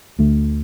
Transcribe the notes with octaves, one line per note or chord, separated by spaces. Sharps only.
D2 D3 A3